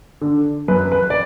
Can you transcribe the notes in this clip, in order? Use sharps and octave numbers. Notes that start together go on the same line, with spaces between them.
D3
F#2 B4
B4
D5